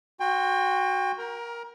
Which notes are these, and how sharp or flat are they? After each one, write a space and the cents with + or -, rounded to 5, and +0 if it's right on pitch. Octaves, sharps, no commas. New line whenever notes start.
F#4 +0 G5 +30 C6 +0
A#4 +10 A#5 +30